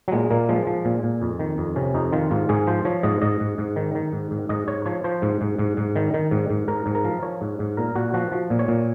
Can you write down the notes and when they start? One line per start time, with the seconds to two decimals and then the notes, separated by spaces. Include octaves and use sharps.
0.08 F#3
0.12 A#2 G#3
0.30 A#2 A#3
0.49 F3 G#3
0.67 F3
0.85 A#2
1.03 A#2
1.22 F2
1.39 D#3
1.58 F2
1.76 C3 C#4
1.94 F2 D#4
2.12 D#3 F4
2.31 G#2 F4
2.49 G#2 G#4
2.67 F3 C5
2.85 F3 C#5
3.03 G#2 D#5
3.22 G#2 D#5
3.40 G#2
3.58 G#2
3.76 D#3
3.95 D#3
4.13 G#2
4.31 G#2
4.49 G#2 D#5
4.67 G#2 C#5
4.86 F3 C#5
5.04 F3 C5
5.22 G#2
5.41 G#2
5.58 G#2
5.77 G#2
5.96 D#3
6.14 D#3
6.31 G#2
6.50 G#2
6.68 G#2 A#4
6.86 G#2
6.95 A#4
7.05 F3
7.22 F3 C#5
7.41 G#2
7.59 G#2
7.77 A#2 A#4
7.95 A#2 F#4
8.14 F3 F#4
8.32 F3
8.50 A#2
8.59 C#5
8.68 A#2